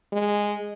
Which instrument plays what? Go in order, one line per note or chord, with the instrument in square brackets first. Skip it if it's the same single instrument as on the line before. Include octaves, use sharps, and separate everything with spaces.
[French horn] G#3